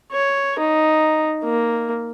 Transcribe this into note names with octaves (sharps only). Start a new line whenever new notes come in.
C#5
D#4
A#3